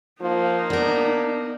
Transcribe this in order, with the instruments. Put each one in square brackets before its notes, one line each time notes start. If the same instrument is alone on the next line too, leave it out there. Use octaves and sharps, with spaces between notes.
[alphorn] F3 [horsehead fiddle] A#3 D#4
[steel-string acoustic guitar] B3 A#4 [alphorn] D4